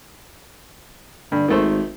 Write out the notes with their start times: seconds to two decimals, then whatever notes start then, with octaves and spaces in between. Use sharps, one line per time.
1.32 G2 D3
1.48 G#1 D#3 A3 C5